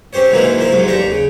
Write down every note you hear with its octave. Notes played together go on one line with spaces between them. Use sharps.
C4 C#4 G4 C5 C#5
G#2 D#3 E3 F#3 A#3 E4
F3 A#3 E4 F4
G#2 C3 F#3
A1 D#2 D4 G4 A#5 C#6
C#3